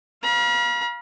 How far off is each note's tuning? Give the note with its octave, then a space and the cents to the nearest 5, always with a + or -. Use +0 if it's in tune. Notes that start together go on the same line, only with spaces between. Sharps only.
F5 +0 B5 -45